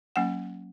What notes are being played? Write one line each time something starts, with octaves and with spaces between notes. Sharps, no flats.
F#3 A#3 C#4 F#5